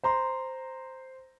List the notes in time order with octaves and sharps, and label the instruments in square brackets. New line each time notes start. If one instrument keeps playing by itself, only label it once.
[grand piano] C5 A#5 C6